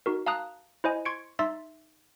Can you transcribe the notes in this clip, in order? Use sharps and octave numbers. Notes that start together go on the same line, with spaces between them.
D#4 F#4 A#4
F5 A5 A#5 D#6 F#6
E4 C5 D#5 G#5
C6 C#6 G#6 C#7 D7
D#4 E5 C6 E6 A6 B6